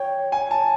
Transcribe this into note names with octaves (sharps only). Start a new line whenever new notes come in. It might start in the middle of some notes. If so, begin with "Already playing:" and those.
Already playing: C#5 G5
G#5
A5